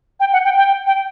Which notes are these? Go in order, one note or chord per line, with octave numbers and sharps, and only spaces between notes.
G5
F#5
G5
G5
G5